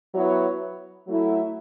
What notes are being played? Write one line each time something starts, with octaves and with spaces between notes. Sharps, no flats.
F#3 B3 E4 C#5
F#3 A3 E4